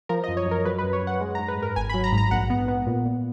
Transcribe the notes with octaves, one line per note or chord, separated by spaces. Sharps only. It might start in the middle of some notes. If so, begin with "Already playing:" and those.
F3 A#4
D#5
F#2
C#5
F#2
A#4
F#3 B4
B4
F#2
C#5
F#2
F#5
G#3
A#5
G#2
B4
G#2
A#4
G#1 G#5
B5
F#3
A#5
G#2
A#5
A#1 F#5
B3
B3
A#2
A#2